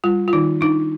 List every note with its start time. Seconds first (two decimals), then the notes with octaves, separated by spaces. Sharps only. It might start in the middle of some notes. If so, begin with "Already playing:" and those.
0.04 G3 F4
0.28 F4
0.33 D#3 D#4
0.61 D4 D#4